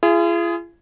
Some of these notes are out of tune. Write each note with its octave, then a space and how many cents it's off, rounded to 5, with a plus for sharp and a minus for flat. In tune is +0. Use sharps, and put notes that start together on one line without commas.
F4 -45 G#4 +0